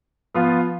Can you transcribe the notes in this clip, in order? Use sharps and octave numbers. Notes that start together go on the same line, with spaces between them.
F3 B3 F4